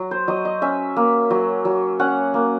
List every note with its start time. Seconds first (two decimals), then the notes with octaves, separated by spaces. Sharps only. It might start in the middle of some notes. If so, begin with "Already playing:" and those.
Already playing: F#3
0.11 C5
0.28 F#3 D#5
0.45 D#5
0.62 C#4 E5
0.97 A#3
1.30 F#3
1.65 F#3
2.00 C#4 F#5
2.34 A#3